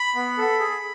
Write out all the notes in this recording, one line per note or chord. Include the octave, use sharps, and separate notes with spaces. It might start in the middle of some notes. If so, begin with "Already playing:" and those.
Already playing: B5
B3
A4
G#4